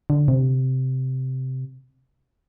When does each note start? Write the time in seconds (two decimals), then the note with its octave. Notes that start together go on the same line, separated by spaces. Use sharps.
0.10 D3
0.28 C3